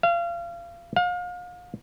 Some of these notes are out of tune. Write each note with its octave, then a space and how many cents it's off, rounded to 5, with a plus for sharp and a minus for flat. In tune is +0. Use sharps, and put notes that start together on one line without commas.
F5 -30
F5 +35